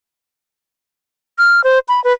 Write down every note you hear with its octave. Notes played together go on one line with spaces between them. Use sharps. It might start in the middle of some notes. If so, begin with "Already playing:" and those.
F6
C5
B5
B4